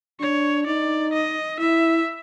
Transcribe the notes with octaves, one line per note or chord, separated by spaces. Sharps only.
D4 C#5
D#4 D5
D#5
E4 E5